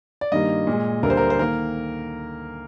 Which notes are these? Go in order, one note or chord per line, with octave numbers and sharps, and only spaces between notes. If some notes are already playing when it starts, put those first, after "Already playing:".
D5
G2 D#3 G3 A#3 D#5
A#2
G#3
D2 D3 G3 A#3 A#4
C5
A#4
C5
D#3 A#3 A#4